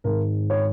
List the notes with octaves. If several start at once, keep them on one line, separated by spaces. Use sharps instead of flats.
G#1 G#2 D#3 G#3 A#4
C#5